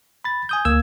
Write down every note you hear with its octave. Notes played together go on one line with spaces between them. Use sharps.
B5 A6
G#5 D#6 G6
D2 A#3 E6 G#6